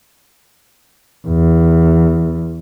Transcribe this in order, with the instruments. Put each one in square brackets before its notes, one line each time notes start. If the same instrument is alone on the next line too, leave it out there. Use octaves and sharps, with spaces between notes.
[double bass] E2